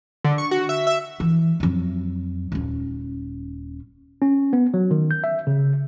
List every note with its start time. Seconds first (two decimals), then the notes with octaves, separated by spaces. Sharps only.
0.24 D3
0.38 C#6
0.51 F#4
0.69 E5
0.87 E5
1.20 E3
1.60 F2 F#3
2.52 D#1 C#4
4.22 C#4
4.53 B3
4.74 F#3
4.91 D#3
5.11 G6
5.24 E5
5.47 C#3